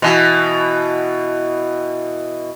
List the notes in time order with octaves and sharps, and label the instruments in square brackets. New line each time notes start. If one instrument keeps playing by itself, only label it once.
[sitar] B2 E3